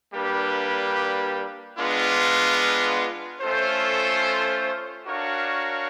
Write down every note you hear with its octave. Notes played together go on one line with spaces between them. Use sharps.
G3 A#3 D4 G4 B4
G#3 B3 D4 F4
A3 C#4 F4 A4 C5
D4 F#4 A#4 C#5 F5